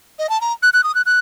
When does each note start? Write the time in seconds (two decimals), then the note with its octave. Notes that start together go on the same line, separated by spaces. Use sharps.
0.19 D#5
0.29 A5
0.41 A#5
0.63 F#6
0.73 F#6
0.84 D#6
0.95 F#6
1.06 F#6